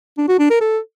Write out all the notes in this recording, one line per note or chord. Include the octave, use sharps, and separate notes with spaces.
D4
F#4
D4
A#4
A4